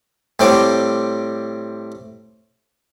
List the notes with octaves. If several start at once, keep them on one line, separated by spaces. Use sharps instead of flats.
A2 G3 C4 G5 D6